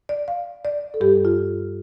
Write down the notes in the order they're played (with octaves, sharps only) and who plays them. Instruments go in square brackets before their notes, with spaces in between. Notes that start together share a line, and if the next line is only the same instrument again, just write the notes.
[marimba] D5
F5
D5
A4
G2 G3 G4
F4